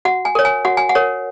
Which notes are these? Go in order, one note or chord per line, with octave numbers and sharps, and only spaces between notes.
F#4 F#5
G#5
A#4 C#5
G#5
F#4 F#5
G#5
F#5
A#4 C#5